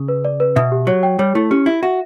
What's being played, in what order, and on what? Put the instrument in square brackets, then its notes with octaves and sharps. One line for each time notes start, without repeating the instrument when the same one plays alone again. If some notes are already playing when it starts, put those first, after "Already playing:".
Already playing: [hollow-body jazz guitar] C#3
[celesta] B4
D5
B4
[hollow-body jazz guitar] B2 [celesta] E5
[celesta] G4
[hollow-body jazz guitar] F#3 [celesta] C#5
[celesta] G5
[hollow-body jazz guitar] G3 [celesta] C#5
[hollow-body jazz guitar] A3 [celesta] E4
[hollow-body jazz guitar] C#4 [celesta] G4
[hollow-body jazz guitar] E4 [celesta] E5
[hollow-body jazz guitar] F#4 [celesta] E5